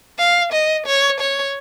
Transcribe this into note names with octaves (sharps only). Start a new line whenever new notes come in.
F5
D#5
C#5
C#5